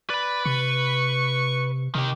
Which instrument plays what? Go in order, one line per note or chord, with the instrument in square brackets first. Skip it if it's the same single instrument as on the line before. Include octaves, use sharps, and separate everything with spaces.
[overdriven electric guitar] B4 B5 [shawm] D5
[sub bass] C3 [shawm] C#6
[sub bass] C3 [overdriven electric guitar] D#3 G4